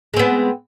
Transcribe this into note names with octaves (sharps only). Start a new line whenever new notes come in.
G#3 B3 C4